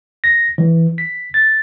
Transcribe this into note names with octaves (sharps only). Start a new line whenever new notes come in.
A#6
E3
B6
A6